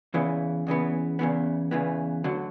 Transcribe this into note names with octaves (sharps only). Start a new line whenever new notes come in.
E2 C#3 E3 B3
E2 C#3 E3 B3
E2 C#3 E3 B3
E2 C#3 E3 B3
D2 D3 F#3